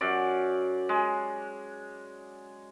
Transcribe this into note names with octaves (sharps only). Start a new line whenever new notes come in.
F#2 D5
G#3